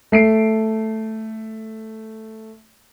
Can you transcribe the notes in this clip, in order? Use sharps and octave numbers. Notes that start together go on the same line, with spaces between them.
A3 C7 D7